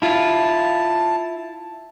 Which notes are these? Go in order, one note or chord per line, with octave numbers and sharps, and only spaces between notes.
E4 F4 A5